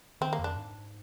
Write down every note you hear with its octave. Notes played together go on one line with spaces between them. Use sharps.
D#3 C4
A#3
F2
D4
G#2